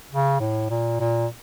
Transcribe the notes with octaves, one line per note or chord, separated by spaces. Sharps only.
C#3
A2
A#2
A#2